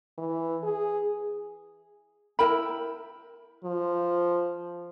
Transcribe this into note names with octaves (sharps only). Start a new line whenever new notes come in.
E3
G#4
E4 A#4 G5 B5
F3